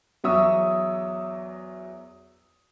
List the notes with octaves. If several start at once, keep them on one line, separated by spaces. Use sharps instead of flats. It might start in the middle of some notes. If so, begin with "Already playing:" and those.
E2 F#3 E5 C#6 D#6 E6